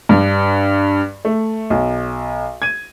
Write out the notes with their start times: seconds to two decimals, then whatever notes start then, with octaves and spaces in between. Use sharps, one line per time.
0.09 G2
1.25 A3
1.70 B1
2.62 G#6 D#7